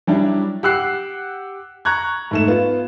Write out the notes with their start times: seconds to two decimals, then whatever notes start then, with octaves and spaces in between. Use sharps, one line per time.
0.07 F#3 G3 D4 E4
0.63 G4 F#5 E6 F#6 C7
1.85 A#5 C#6 F#6 G#6
2.31 G#2 A3 E7
2.48 B3 F4